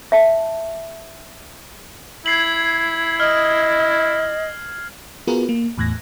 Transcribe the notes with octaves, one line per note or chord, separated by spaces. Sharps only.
E5 A5
E4 G#6 C7 F#7
D#5 F6
B3 F4 F#4 G#4 A#4 B4
A#3
E2 A2 F#6 G#6 A#6